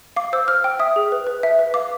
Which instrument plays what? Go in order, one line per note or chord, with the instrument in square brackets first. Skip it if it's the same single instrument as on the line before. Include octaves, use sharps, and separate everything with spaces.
[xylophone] F5 D6
C5 E6
C5 F6
G5
E5 D#6
G#4
B4
B4
E5
B4
F5 D6